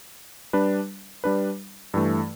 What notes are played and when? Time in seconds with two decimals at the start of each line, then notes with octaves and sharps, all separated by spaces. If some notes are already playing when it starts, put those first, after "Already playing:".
0.53 G3 D4 B4
1.24 G3 D4 B4
1.94 G2 E3 A3